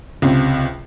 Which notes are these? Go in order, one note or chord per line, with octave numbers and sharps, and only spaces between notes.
C#2 C3